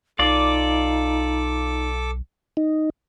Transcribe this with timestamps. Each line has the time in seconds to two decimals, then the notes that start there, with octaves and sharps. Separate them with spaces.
0.19 B1 D#4 F4 A4 D5 D6
2.57 D#4